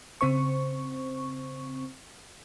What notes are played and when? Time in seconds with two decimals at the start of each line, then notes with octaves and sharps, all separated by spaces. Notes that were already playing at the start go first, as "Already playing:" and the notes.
0.21 C#3 C4 C5 C#6